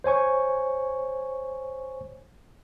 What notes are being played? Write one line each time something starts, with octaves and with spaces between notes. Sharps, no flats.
C5 C#5 G#5 C#6